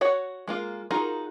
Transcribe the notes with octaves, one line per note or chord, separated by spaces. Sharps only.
F#4 C#5 F#5
G#3 A#3 F4
D#4 F4 F#4 G#4 A#4